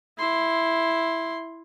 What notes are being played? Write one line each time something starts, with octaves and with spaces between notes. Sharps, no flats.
E4 C6